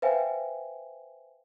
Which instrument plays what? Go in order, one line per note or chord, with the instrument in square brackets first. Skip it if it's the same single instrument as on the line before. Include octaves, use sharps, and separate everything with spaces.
[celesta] B4 C5 E5 F5 G5 G#5